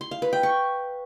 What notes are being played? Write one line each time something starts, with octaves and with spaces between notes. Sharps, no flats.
C6
F5
B4
G5
C#6